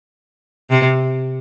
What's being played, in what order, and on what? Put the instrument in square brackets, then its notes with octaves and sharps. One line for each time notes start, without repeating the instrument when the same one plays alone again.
[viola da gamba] C3